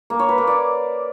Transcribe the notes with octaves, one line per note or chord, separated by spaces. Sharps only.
A#3
C#5
B4
A#3
D5